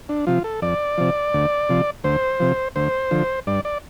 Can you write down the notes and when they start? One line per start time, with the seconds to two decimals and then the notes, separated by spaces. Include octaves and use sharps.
0.09 D4
0.27 C3 F3 F4
0.44 A4
0.62 F2 D5
0.98 C3 F3
1.34 D2
1.69 C3 F3
2.04 D2 C5
2.40 C3 F3
2.76 D2 C5
3.11 D3 F3
3.47 G2 D5
3.65 D5